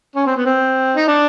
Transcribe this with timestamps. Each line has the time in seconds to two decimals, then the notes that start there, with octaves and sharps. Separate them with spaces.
0.15 C#4
0.26 C4
0.36 B3
0.46 C4
0.96 D#4
1.08 D4